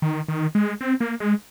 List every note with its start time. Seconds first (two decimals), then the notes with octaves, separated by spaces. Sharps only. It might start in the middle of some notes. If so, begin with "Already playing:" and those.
0.02 D#3
0.28 D#3
0.55 G#3
0.81 C4
1.00 A#3
1.20 G#3